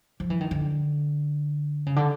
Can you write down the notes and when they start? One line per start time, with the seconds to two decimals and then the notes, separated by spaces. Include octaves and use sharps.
0.20 F3
0.30 E3
0.41 D#3
0.51 D3
1.86 C#3
1.96 D3